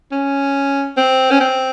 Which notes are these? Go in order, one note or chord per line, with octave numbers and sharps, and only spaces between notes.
C#4
C4
C#4
C4